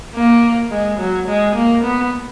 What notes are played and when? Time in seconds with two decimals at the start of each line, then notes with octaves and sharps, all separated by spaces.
0.15 A#3
0.71 G#3
0.99 F#3
1.28 G#3
1.55 A#3
1.83 B3